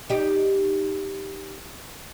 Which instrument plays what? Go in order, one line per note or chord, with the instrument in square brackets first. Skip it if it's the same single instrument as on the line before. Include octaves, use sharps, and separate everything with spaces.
[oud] D#4 G4